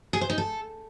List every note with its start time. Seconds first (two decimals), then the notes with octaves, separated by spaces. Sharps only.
0.13 G#4
0.21 C5
0.30 D#4
0.38 A4